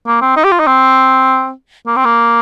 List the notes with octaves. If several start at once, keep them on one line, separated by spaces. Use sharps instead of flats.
A#3
C4
D#4
G4
F4
D#4
C4
A#3
C4
A#3